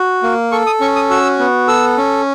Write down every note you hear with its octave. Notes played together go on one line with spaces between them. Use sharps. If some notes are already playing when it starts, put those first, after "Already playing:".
Already playing: F#4
A#3
A4 C#6
D#6
C#4 C#6
D#6
F#4 E6
B3
A4 E6
C#4